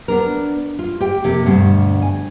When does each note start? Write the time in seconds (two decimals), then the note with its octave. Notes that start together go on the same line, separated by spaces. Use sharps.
0.08 B3 D4 A#4
0.79 F4
1.00 G4 G5
1.24 F2 C3 A#3 G4
1.46 D2 G2 B2
2.02 G#5